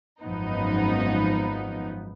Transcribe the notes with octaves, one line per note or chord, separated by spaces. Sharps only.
G#1 F#2 F3 B3 D#4